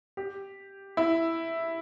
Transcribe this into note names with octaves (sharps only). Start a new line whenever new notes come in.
G4
E4